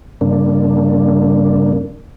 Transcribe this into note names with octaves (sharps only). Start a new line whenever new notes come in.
G2 C#3 A#3 D4